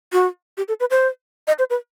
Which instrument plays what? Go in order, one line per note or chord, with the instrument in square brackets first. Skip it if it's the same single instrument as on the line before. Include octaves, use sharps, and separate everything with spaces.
[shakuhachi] F#4
G4
A4
B4
C5
D#5
C5
B4